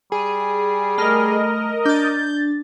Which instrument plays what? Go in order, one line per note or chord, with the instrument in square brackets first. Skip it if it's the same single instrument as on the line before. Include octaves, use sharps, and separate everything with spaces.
[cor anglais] G3 [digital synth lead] G#4
[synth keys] A3 F6 [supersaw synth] A#4 D#5
[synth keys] D4 A6 [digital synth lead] G6